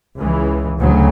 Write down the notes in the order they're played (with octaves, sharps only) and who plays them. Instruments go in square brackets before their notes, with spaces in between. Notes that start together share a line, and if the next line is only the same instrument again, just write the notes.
[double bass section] C#2 C#3 E3
D2 C#3 F#3